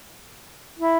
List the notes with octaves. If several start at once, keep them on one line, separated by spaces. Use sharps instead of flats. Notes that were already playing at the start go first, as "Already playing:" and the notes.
E4